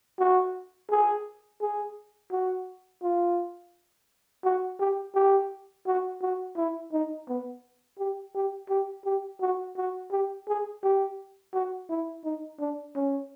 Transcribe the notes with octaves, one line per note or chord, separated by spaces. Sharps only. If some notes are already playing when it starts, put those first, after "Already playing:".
F#4
G#4
G#4
F#4
F4
F#4
G4
G4
F#4
F#4
E4
D#4
B3
G4
G4
G4
G4
F#4
F#4
G4
G#4
G4
F#4
E4
D#4
D4
C#4